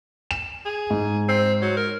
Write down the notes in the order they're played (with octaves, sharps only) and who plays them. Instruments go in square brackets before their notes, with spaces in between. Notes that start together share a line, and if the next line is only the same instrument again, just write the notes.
[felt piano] E7
[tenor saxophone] G#4
[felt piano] G#2
[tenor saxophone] C4
F#3
A#4